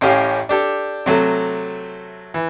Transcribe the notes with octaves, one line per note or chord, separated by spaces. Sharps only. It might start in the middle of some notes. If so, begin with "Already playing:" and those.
A1 A2 C#4 G4 F5
D4 G4 A4
C3 F#3 A3
E3